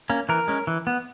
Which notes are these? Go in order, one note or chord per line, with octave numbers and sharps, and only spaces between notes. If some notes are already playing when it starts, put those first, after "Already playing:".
A#3 C#4
E3 A#4
G#3 C#4
E3
B3